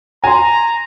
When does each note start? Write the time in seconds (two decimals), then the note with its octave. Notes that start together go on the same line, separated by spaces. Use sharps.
0.24 G#5 A#5 C6